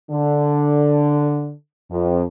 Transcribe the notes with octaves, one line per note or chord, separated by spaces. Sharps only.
D3
F2